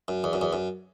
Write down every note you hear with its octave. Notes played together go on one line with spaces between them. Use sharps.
F#2
E2
F#2
E2
F#2